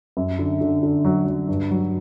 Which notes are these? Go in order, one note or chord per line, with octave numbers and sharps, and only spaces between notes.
F#2
D3
D3
D3
F#3
F#3
G2
F#3